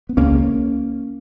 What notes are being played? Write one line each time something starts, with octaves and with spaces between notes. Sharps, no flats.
B3
C#2 C#3 A#3 C#4